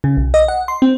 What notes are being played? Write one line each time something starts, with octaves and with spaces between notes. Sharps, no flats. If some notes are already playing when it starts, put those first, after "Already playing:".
C#3
B1
D#5
F#5
C6
C4